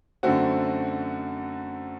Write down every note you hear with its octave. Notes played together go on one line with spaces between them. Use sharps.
F#2 D3 A3 C4 F#4